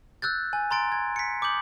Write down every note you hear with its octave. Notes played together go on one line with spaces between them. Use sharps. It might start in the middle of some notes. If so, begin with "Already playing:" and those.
E6 F#6 G6 A6
G#5
A#5 C6 A6 D7
G#6
B6 C#7
D6 D#6 G6 F#7